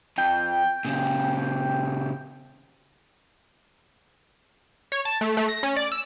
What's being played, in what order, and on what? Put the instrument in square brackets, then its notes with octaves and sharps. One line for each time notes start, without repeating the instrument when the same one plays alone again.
[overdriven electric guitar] F2 [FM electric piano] G5 G6
[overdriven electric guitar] A#2 C#3
[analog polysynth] C#5
A5
A3
A3
A#6
C#4
D5
E6